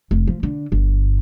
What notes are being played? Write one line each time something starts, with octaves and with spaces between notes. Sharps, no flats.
F1
F3
D3
G1